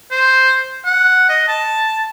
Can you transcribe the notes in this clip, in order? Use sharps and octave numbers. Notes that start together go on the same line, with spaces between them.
C5
F#5
D#5
A5